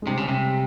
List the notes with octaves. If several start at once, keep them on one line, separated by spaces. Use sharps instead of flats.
G#3
C3 G3
C#3
C3